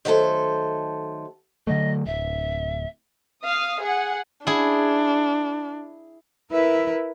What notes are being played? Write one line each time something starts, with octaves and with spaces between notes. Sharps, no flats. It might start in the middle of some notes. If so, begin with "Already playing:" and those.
D#3 F#3 A3 A4 C5
D3 F#3 A3 D#5
D1 E5
F5 D#6
G#4 F#5
D4 E4 G#4
E4 A#4 B4 E5